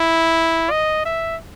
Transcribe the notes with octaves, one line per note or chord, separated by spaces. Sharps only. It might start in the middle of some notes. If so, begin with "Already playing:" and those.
Already playing: E4
D#5
E5